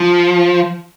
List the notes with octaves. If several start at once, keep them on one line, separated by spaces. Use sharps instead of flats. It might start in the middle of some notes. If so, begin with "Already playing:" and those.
Already playing: F3